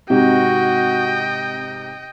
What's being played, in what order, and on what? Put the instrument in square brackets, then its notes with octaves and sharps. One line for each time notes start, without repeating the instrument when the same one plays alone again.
[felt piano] G#2 C3 D#4 [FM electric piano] C4 [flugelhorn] F#4 [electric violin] D#5 G5